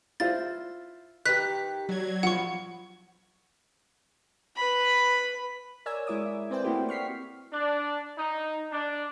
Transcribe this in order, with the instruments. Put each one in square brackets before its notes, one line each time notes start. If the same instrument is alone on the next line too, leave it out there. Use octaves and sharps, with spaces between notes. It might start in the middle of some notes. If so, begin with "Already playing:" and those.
[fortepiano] E4 F4 C5 [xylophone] A6
[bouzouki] D#3 G4 [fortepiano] B4 [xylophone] F#6 B6
[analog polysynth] F#3 G#6 [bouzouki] D4
[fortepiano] F3 [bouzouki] B3 [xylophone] F#5 C#6
[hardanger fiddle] B4 B5
[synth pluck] A#4 C#5 D5 G#5 E6 G#6
G#3 E4 E5 D6 D#6
E5
C4 B4 C5 D5 G5
A3 A#3 C4 E4 F#4 G4
C#6 F6 B6 C7
[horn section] D4
D#4
D4